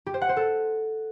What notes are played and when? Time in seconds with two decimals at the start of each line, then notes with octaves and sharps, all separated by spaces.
0.06 G4
0.14 C5
0.21 F#5
0.29 C5
0.37 A4